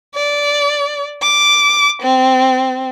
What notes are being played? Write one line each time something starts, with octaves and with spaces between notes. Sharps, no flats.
D5
D6
C4